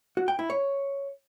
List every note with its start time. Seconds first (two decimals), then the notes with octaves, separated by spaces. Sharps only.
0.17 F#4
0.28 G5
0.39 E4
0.50 C#5